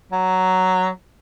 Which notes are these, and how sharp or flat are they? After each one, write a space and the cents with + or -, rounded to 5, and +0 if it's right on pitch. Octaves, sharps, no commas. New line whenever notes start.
F#3 +5